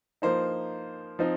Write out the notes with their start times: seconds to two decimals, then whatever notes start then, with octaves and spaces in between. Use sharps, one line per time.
0.22 F3 A#3 D#4 C5
1.19 F3 C4 D#4